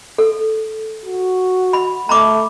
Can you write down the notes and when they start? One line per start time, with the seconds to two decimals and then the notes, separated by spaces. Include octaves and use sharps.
0.18 A4
1.06 F#4
1.73 B5
2.09 A3 A#5 B5 D6